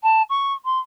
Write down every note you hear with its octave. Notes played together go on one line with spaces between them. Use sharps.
A5
C#6
C6